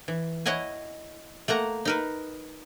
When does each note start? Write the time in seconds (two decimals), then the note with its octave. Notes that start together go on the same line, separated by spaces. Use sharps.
0.08 E3
0.46 E4 C#5 D#5 F#5 G#5
1.48 A3 A#3 F#5 A#5
1.85 D#4 A#4 B4